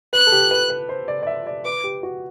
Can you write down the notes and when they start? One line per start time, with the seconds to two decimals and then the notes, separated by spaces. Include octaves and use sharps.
0.13 B4 F#6
0.27 A4
0.32 G4
0.51 B4
0.70 B4
0.89 C5
1.08 D5
1.23 D5
1.27 E5
1.47 D5
1.65 B4 D6
1.84 G4
2.03 F#4